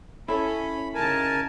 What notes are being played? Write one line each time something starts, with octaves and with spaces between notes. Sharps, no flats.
C#4 E4 A4 B5
C#3 D#4 A#4 G#5 A5